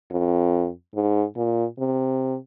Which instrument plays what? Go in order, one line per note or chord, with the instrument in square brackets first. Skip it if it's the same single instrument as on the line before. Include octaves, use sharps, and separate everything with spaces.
[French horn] F2
G#2
A#2
C3